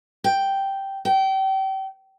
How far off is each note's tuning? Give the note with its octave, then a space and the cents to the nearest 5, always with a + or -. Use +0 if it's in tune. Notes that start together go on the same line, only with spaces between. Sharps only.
G5 -5
G5 -30